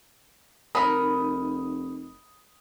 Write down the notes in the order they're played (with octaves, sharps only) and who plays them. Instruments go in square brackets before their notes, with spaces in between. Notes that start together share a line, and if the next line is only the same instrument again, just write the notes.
[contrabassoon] F1 [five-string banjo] D#4 A#4 [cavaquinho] B5 [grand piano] D#6